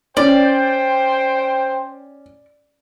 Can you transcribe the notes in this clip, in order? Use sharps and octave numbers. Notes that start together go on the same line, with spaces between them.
C#4 C5 D5 G5